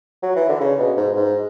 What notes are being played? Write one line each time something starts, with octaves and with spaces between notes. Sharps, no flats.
F#3
E3
D3
C#3
B2
G#2
G#2